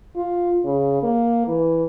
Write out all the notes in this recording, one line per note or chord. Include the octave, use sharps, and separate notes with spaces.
F4
C#3
A#3
E3